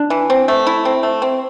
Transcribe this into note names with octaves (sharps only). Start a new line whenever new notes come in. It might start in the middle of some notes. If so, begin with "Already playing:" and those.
Already playing: D4
E3
C4
A3
E4
C4
A3
C4